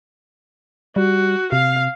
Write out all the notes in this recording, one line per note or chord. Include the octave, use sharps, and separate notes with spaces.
G3 F#4
C3 F5